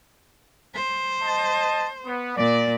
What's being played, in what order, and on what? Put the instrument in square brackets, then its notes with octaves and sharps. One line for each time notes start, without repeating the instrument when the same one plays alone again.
[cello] C5
[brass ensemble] D#5 A5
B3
[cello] A#2 [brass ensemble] D5